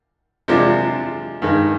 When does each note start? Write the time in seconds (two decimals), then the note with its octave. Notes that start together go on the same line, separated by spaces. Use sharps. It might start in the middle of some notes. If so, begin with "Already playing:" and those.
0.48 C3 F3 G#3 D4
1.42 G2 D#3 G#3